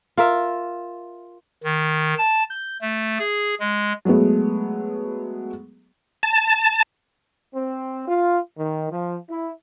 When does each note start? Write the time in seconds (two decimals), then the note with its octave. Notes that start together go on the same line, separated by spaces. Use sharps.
0.17 F4 A#4 E5
1.64 D#3
2.18 A5
2.50 G6
2.81 A3
3.19 G#4
3.60 G#3
4.05 F#3 G#3 A3 B3
6.23 A5
7.54 C4
8.07 F4
8.58 D#3
8.91 F3
9.29 E4